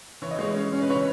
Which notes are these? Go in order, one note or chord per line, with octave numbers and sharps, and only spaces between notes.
E3 C#5
D#5
G#3 C#5
C#4
C#4
B4
E3 C#5